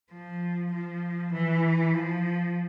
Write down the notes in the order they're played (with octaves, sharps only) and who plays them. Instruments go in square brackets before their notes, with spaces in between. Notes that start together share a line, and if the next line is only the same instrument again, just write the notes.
[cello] F3
F3
E3
F3